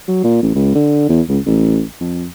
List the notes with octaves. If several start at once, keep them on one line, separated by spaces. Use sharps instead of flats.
F#3
A#2
A1
C#2
D3
E2
C#2
A1
F2